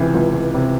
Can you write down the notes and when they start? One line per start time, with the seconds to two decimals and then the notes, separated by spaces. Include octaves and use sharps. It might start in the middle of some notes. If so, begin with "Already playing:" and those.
Already playing: C#2 C3 E3
0.15 C#2
0.34 C#2
0.54 C3